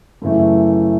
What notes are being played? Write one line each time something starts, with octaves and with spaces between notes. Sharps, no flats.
F#2 C#3 E3 A3